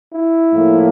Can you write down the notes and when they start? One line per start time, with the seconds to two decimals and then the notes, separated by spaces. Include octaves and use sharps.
0.13 E4
0.52 A2 F3 A#3